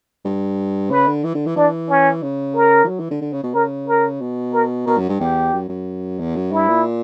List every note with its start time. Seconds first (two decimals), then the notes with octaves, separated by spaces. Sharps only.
0.25 G2
0.90 C#3 B4
1.07 D3
1.24 E3
1.34 D3
1.46 E3
1.56 E3 D4
1.90 C#4
2.23 C#3
2.55 A#4
2.84 E3
2.88 F#3
2.99 E3
3.11 D3
3.21 D3
3.32 C#3
3.43 B2
3.54 C#3 A#4
3.88 A#4
4.21 B2
4.54 A#4
4.87 B2 A#4
4.97 F#2
5.09 G2
5.19 E2 G4
5.53 F#2
5.69 F#2
6.19 E2
6.35 F#2
6.52 G2 E4
6.68 A#2